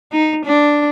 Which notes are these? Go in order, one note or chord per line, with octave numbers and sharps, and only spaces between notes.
D#4
D4